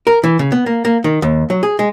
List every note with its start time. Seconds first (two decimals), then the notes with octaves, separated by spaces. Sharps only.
0.07 A#4
0.24 E3
0.39 C#3
0.52 B3
0.66 A#3
0.85 A#3
1.04 D#3
1.22 D#2
1.50 F#3
1.63 G#4
1.79 G#3